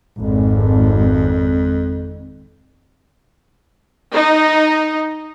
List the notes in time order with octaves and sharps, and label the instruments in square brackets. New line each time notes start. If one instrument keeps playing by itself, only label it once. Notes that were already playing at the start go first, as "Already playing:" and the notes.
[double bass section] G#1 [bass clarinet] F2
[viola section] D#4